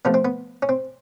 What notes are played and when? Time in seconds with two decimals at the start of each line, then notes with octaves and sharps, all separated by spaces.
0.05 C3 F3 A3 B3
0.14 C4
0.25 B3
0.62 C#4
0.69 C4